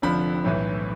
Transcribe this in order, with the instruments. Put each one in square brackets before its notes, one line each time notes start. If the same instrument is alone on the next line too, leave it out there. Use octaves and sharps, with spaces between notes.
[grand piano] F1 F2 D3 F3 B5
B1 A2 E3